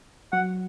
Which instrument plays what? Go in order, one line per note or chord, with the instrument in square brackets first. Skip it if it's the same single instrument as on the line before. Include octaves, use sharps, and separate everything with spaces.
[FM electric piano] F#3 [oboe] F#5